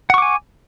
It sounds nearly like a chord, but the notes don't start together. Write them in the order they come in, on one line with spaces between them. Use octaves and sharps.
F#5 C#6 D6 G#5